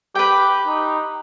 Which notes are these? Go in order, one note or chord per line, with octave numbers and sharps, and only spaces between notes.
G4 B4 G5
D#4